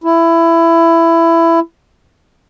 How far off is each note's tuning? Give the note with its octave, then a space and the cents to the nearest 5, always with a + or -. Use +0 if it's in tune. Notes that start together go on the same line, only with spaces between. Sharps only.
E4 +15